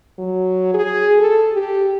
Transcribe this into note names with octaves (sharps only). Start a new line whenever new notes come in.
F#3
G#4
A4
G4